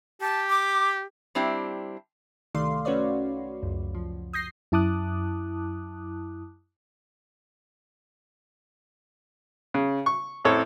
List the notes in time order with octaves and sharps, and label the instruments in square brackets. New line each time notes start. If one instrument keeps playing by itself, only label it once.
[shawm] G4 [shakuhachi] A5
[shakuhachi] D6
[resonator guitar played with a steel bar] G3 C4 D4 E4 G4
[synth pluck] C2 D#3 A3 D5 F5 C6
A3 C#4 F#4 B4 C#5 D5
C#2 F#2
F3
D#6 G6 A#6 C7
[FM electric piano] F#2 E4 A5 D6 D#6 F#6
[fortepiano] C#3
C#6
A1 C4 E4 A4 C#5